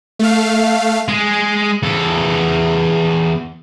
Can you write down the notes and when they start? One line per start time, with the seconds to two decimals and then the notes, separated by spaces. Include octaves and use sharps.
0.19 A3 F5
1.08 G#3 G#4
1.83 E2 A4